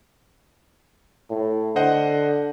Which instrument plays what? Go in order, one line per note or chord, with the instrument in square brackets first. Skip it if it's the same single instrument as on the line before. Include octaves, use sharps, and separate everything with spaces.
[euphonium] A2
[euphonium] D3 [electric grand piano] C5 D#5 F#5